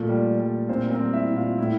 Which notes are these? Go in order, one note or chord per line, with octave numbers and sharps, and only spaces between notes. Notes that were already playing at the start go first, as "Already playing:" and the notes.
Already playing: A#2 F3 A3
G3
G3
A#2 C4 C5
A#4
C4 C5
G3
E4 E5
A#2
F4 F5
A2 E4 E5